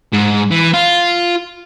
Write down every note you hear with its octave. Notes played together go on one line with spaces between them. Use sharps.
G#2
E3
F4